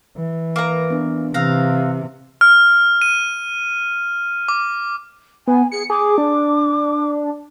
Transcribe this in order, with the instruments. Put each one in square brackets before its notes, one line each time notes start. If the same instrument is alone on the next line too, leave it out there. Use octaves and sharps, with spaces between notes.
[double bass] E3
[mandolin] A#3 A#5 [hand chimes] B4 D7
[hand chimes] B3 D4
[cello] C3 [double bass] E3 [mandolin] F5 A#5 [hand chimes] E6 F#6 A#6
[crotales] F6
D#7
D6
[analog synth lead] B3 [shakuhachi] G#5
[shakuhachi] G#4 [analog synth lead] C#7
[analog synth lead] G#4 [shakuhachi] D6
[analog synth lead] D4